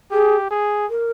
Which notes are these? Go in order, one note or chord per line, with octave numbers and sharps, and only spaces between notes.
G4 G#4
G#4
A#4